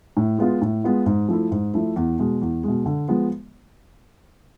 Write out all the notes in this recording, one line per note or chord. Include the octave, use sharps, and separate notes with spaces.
A2
G#3 B3 F4
A2
G#3 B3 F4
G#2
F3 A3 E4
G#2
F3 A3 E4
E2
B2 G#3
E2
B2 G#3
D3
F3 G#3 B3